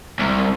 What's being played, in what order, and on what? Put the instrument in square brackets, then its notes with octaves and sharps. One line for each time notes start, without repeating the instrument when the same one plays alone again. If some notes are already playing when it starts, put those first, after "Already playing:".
[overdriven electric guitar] C2